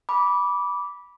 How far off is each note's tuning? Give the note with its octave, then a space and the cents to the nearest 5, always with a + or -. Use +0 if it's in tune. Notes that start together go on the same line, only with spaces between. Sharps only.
B5 -15 D6 -15